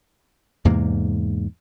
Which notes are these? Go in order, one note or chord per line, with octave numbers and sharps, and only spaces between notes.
E2 G#2 C3 A#3